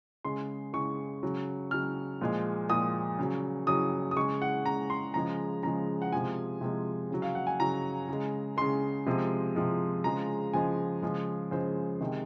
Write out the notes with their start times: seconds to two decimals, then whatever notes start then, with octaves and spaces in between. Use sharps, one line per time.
0.24 C#3 G#3 C6
0.73 C#3 G#3 C#6
1.23 C#3 F#3
1.71 C#3 F#3 F6
2.21 A#2 F3 G#3
2.69 A#2 F3 G#3 D#6
3.19 C#3 F#3
3.67 C#3 F#3 D#6
4.11 D#6
4.16 C#3 G#3 C#6
4.42 F#5
4.65 C#3 G#3 A#5
4.90 C6
5.14 C#3 F3 G#3 A#5
5.63 C#3 F3 G#3 A#5
6.02 F#5
6.12 C3 F3 G#3 G#5
6.61 C3 F3 G#3
7.10 C#3 F#3
7.22 F5
7.35 F#5
7.47 G#5
7.60 C#3 F#3 A#5
8.08 C#3 G#3
8.57 C#3 G#3 C6
9.06 C3 F3 G#3
9.55 C3 F3 G#3
10.04 C#3 F3 G#3 A#5
10.53 C#3 F3 G#3 G#5
11.02 C#3 F3 G#3
11.51 C#3 F3 G#3 C5
12.00 C3 D#3 G#3